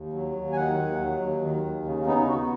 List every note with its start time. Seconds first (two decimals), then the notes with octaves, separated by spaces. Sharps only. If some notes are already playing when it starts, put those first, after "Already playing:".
Already playing: D#2
0.13 F#3
0.35 D#2
0.52 G#5
0.56 D#3 F#5
0.79 D#2
0.99 F#3
1.20 D#2
1.42 D#3
1.64 D#2
1.85 C#3
2.07 B3 D#4
2.20 D#4
2.28 B3 F#4